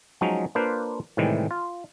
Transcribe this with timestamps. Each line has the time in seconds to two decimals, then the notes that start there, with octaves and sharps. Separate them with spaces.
0.21 F3 F#3 G#3 C#4 D#4
0.55 A#3 D4 F4 B4 C5 F5
1.17 A2 C3 D#3 E3 G3 G#3
1.51 F4